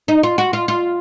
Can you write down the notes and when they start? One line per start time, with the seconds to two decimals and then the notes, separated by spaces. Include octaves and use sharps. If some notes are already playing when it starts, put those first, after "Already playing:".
0.08 D#4
0.23 F4
0.38 F#4
0.53 F4
0.68 F4